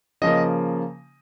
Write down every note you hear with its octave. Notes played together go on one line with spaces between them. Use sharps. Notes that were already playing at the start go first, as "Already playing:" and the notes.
C#3 F3 A#3 D#5